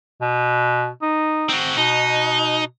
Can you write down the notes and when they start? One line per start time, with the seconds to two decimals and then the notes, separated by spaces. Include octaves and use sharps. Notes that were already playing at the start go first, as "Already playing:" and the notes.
0.21 B2
1.02 D#4
1.49 C4 F#4
1.77 B2 D#4